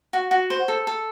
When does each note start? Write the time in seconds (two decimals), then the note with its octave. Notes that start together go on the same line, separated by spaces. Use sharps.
0.13 F#4
0.31 F#4
0.50 C5
0.68 A4
0.87 A4